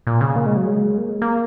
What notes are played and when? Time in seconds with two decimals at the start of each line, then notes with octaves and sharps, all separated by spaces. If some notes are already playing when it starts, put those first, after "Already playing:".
0.07 A#2
0.21 C#3
0.36 A#3
0.46 G#3
0.56 F#3
0.67 G#3
0.98 A#3
1.10 G#3
1.22 A#3